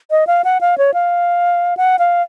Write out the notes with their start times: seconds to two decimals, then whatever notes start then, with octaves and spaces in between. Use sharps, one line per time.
0.11 D#5
0.27 F5
0.44 F#5
0.61 F5
0.78 C#5
0.94 F5
1.77 F#5
1.99 F5